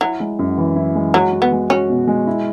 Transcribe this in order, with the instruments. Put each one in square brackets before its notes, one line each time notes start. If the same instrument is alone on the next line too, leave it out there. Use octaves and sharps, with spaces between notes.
[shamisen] F#3 [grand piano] E4
[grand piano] G#3
F#2
E3
E4
G#3
[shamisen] F#3 [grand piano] F#4
[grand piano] F#4
[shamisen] B3
[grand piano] G#3
[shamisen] C#4 [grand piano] F#4
[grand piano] B2
G#3
E4